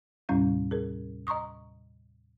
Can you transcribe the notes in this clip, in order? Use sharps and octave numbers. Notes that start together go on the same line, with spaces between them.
D#2 A2 C3 G3 C#4 E4
G#4 A#4
D#5 A#5 C6 C#6 D#6